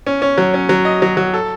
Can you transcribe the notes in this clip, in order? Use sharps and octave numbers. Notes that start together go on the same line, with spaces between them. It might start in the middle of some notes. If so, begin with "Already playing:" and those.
C#4
C#4
F#3
C#4
F#3
D#5
F#3
F#3
A4